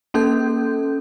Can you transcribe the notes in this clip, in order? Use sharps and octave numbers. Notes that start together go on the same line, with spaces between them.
A#3 C#4 A4 G6